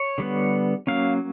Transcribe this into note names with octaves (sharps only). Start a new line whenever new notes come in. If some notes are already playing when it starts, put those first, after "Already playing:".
Already playing: C#5
D3 G3 B3
F#3 A#3 C#4 F5